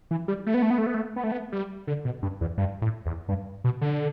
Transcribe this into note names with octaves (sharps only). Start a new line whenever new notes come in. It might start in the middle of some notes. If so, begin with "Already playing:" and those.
E3
G3
A3
B3
A3
B3
A3
B3
A3
B3
A3
B3
G3
D3
B2
G2
E2
G2
A2
E2
G2
B2
D3